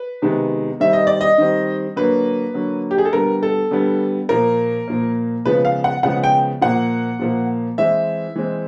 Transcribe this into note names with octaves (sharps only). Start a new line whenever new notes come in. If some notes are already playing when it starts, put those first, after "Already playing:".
Already playing: B4
C3 D#3 G#3 B3
D#3 G3 C4 E5
D#5
D5
D#5
D#3 G3 C4
D3 F#3 A#3 B4
D3 F#3 A#3
G4
G#4
A4
D3 G3 B3 A#4
A4
D3 G3 B3
A#2 F3 A#3 A#4
A#2 F3 A#3
C#3 F3 G#3 B3 B4
F5
F#5
C#3 F3 G#3 B3 F#5
G5
A#2 F3 A#3 F#5
A#2 F3 A#3
E3 G#3 C4 E5
E3 G#3 C4